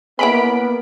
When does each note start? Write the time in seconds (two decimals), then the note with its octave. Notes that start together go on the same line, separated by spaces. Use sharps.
0.19 E3 G#3 A#3 B3 C#4 B5 B6 D7